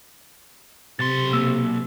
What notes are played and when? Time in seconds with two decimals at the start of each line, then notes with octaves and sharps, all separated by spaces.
0.99 B1 C3 C6 A6
1.33 A#3 E6